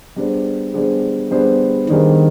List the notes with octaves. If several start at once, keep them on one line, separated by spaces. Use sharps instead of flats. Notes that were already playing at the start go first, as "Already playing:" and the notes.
G3 B3 D4 G#4 C5
G3 B3 D4 G#4 C5
G3 B3 D4 G#4 C5
D#3 G3 B3 D4 G#4 C5